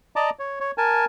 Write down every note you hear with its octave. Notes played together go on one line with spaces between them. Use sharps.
D5 D#5 A5 A#5 D6
C#5
C#5
A#4 G#5 A5